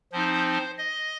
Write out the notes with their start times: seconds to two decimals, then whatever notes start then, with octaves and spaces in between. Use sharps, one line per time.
0.12 F3 C4 D#4 C5
0.78 D#5